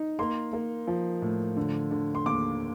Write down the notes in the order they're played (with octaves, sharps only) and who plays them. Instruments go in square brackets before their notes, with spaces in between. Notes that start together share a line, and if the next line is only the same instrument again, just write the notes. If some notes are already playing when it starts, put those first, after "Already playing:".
Already playing: [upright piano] D#4
A#3 C6
A#3
F3
A2
D3
D3
C6
D#2 D6